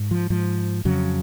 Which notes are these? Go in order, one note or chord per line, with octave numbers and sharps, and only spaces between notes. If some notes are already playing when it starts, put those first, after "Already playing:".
Already playing: G#2
F3
G#2 F3
F2 C#3 F#3